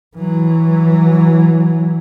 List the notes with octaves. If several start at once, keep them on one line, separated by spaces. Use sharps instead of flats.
E3 F#3